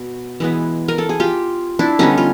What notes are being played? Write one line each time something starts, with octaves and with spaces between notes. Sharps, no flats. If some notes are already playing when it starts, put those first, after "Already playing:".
Already playing: B2
E3 G#3 B3
A#4
A4
G#4
F4 G4
D4 E4
D3 G3 B3 C#4 D#4
F4